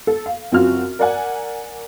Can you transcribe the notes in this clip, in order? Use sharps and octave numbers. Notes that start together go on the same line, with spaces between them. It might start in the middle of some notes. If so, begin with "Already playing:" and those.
A4
F5
F#2 C4 F4 F#4 F6
A#4 D5 F#5 G#5